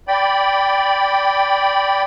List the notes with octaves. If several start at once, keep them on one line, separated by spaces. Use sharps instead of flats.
D5 G5 B5